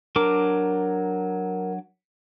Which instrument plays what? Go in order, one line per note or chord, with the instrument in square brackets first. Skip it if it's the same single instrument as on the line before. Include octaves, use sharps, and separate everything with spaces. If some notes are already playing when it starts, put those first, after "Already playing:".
[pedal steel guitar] F#3 D4 D6 [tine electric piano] A#4